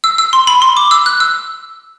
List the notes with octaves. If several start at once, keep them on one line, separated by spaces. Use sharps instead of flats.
E6
E6
C6
B5
C6
D6
E6
F#6
E6